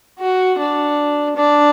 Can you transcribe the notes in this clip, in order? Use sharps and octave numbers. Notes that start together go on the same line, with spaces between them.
F#4
D4
D4